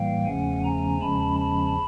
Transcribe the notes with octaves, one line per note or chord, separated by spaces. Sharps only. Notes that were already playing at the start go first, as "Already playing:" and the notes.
Already playing: A2 E3 G3 A#3 F5 G5
E2 C#3 F3 A3 C#4 F#5 G#5
G#5 A#5
E2 C#3 F3 G#3 C#4 A5 B5
A5 B5